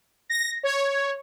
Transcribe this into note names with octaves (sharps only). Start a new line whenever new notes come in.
A#6
C#5